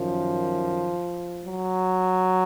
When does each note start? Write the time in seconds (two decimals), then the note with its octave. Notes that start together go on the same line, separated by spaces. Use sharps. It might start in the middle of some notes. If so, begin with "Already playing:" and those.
Already playing: F#2 D#3 F3
1.45 F#3